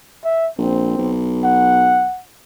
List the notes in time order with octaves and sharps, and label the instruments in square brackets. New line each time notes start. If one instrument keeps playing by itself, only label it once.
[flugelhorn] E5
[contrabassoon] A#1 [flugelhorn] C4
[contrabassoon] B1
[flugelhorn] F#5